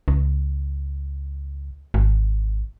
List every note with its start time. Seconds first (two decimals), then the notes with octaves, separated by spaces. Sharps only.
0.08 C#2
1.94 G#1